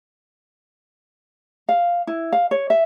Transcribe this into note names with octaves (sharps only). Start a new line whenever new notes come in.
F5
E4
F5
C#5
E5